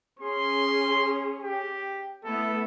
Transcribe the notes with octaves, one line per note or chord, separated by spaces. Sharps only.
C#4 G#4 C6
G4
A3 B3 E4 A4